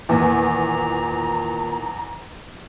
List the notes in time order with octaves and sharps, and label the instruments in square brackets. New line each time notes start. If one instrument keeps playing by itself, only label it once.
[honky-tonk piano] E2 [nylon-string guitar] A#2 D#3 [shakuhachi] A#5